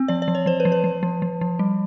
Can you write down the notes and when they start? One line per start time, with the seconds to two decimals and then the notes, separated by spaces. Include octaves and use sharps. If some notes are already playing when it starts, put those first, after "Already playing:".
Already playing: C4
0.08 F3 D5
0.22 D5
0.28 F3
0.35 C#5
0.46 F3 C5
0.60 B4
0.65 F3
0.72 B4
0.84 F3
1.03 F3
1.22 F3
1.41 F3
1.59 G3